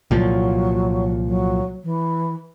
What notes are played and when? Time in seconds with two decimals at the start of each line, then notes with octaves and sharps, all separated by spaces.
0.11 C2 A#2 F3 F#3
1.26 F#3
1.83 E3